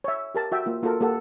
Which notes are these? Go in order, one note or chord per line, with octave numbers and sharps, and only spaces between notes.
C#5 E5
G4 A#4 A5
F#4 E5 G5
A#3 F4
A#3 F4 F#4 A4 A#4
A#3 G4 A4 F#5